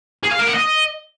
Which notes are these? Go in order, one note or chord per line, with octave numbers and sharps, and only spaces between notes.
G#4
F5
A#4
F#5
D#5